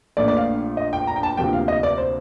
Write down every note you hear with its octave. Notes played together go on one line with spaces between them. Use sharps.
A#1 A#2 F3 A3 D4 D5
D5
F5
D#5
G5
A#5
G5
A5
D2 C3 F3 A#3 G5
F5
D#5
D5
C5